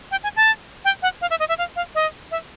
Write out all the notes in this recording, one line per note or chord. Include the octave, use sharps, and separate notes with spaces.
G5
G#5
A5
G5
F#5
F5
E5
D#5
E5
F5
F5
D#5
E5